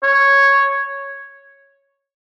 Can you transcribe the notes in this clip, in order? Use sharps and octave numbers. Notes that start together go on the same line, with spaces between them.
C#5